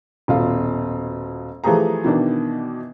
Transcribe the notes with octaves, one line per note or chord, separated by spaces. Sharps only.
D#1 B2 F4
E3 F3 A3 G4 G#4 A#5
B2 D#3 E3 D4